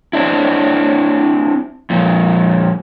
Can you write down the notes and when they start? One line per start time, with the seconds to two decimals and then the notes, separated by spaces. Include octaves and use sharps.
0.13 C4 D4 E4
1.90 F2 A#2